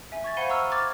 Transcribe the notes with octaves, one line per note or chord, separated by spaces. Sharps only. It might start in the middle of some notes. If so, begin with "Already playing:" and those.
E5 G#5
C#6 G#6 A6
C5 F5 F#5 B5 D#7 G7
F#5 A#5 C#6 E6 F6
D6 F6 G#6 A6